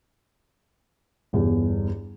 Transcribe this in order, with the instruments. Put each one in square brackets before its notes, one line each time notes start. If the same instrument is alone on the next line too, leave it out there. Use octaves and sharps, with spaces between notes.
[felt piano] G1 E2 G2